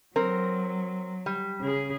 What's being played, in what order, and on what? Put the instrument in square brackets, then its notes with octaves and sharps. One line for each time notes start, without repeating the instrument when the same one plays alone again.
[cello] F#3 [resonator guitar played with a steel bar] C4 A#4
[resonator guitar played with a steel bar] G3
[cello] C#3 G#4